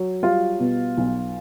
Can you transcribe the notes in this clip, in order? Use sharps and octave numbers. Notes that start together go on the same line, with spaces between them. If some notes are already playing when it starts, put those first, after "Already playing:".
Already playing: F#3
G3 F4
B2
B1